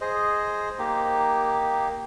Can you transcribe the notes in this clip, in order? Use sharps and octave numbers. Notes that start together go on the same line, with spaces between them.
G#4 C5 D#5
A#3 D#4 G4